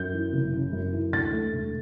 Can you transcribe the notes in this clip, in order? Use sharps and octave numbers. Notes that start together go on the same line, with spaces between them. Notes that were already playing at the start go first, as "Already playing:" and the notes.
Already playing: F#2 G6
E3
F#1
C#3
F#2
E3
D2 A6
A3
E1